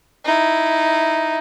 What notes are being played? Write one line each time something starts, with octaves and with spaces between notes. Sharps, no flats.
D#4 E4